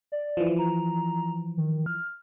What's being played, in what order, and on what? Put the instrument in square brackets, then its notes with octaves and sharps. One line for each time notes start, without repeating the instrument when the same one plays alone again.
[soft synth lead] D5
[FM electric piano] E3 F3
[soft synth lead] A#5
D#3
F6